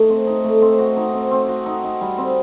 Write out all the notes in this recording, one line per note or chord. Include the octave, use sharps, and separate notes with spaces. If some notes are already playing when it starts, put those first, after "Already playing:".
Already playing: A3 D#4
C4
D#4
A3
C4
F#4
D#4
C4
C4
F#4
D#4
D#4
G3
C4